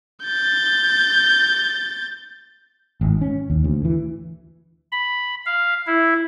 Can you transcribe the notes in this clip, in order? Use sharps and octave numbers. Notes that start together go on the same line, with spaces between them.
G6 A6
G#1
C#4
D#2
D2
E3
B5
F5
E4